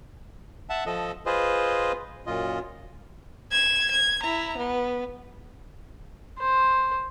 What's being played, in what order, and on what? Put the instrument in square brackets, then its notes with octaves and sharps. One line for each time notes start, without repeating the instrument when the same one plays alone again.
[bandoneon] E5 F#5 A5
F3 A4 D#5
F4 G#4 B4 C5 D#5
F#2 A#2 F4 D#5
[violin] G#6 E7
G#6
E4 A#5
B3
[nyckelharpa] C5